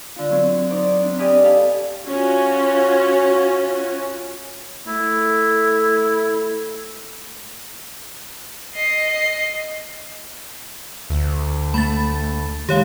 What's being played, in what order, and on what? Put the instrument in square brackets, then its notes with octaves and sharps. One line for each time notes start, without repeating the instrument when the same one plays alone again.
[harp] D3 F4
F#3 C4
D#4 C5 D5
C4 D4
G4 D5 D#5 G#5 B5 F6
A4 F5 A5 B5 F6
[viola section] C#4 F4 F#4
[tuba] A3 [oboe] E4
[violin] D#5 C7
[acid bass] D2
[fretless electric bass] A3 [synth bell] B5 A6
[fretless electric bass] D#3 G#3 [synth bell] G4 C#5 F5